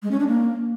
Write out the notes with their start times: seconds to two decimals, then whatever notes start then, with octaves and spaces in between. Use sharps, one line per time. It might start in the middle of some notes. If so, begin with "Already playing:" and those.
0.03 G#3
0.11 C#4
0.19 D4
0.28 A#3